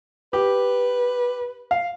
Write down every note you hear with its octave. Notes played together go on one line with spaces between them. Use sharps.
G4 B4
F5